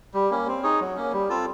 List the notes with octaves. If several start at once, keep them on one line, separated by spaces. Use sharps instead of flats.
G3
A#3 C#4
C4
D#4 G#4 C#5
F#3
A#3 C#4
G3
C4 F4 A4